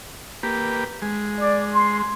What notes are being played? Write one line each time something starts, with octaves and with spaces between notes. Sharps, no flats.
A#3 G4 B4
G#3
D5
C6